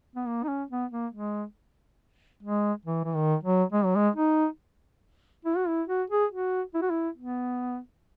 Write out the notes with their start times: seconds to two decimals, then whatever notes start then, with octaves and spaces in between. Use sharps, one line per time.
0.16 B3
0.27 A#3
0.43 D#4
0.48 C#4
0.70 B3
0.92 A#3
1.13 G#3
2.43 G#3
2.86 E3
3.04 E3
3.15 D#3
3.44 F#3
3.73 G#3
3.85 F#3
3.96 G#3
4.16 D#4
5.45 E4
5.56 F#4
5.67 E4
5.88 F#4
6.10 G#4
6.32 F#4
6.74 E4
6.82 F#4
6.90 E4
7.18 B3